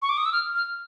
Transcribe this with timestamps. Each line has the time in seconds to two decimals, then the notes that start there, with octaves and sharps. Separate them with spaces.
0.02 C#6
0.09 D6
0.17 D#6
0.26 E6
0.33 F6
0.55 F6